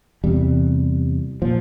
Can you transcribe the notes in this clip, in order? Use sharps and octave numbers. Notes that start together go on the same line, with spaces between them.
E2 C3 G3
A#2 F3